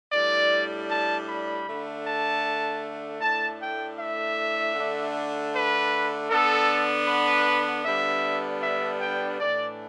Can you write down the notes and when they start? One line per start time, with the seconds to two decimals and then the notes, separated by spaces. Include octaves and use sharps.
0.12 A2 G3 D4 D5
0.89 A5
1.28 B5
1.67 D3 A3 D4
2.05 A5
3.21 A2 A3 D4 A5
3.60 G5
3.98 E5
4.75 D3 A3 D4
5.53 B4
6.30 D3 B3 D4 A4
7.07 B4
7.85 D3 G3 B3 D4 E5
8.62 E5
9.01 G5
9.39 A2 E3 A3 D4 D5